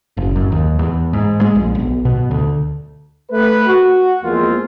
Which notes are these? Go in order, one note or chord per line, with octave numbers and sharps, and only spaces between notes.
F#1
F#2
D#2
E2
G#2
G#3
A#1
B1
B2
D2
A3 B4
F#4
E2 F3 G#3 A#3 C4 F4